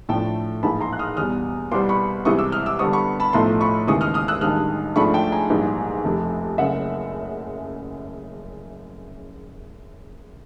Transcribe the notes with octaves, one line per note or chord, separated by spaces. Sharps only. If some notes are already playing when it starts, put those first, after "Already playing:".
A2 F3 A3 D4 G5 A5
A#1 G#2 E3 A5 B5
A#5 C6
F#6
D#6 F6
E2 B2 G3 D#6 F6
C2 B2 G3 B3 C6 D6
B5 C#6
C2 C3 E3 G#3 C#6 D#6
D6 E6
D#6 F6
D6 E6
G2 D3 G3 B3 C#6 D#6
B5 C#6
A5 B5
B1 A2 F3 A3 A#5 C6
B5 C#6
D#2 C#3 E3 G#3 C#6 D#6
D#6 F6
D#6 F6
E6 F#6
A1 G2 D#3 G#3 D#6 F6
G#2 F3 A3 D4 B5 C#6
G5 A5
G#5 A#5
A#1 G#2 E3 G3
F1 F2 C3
F#1 F#2 C#3 E5 F#5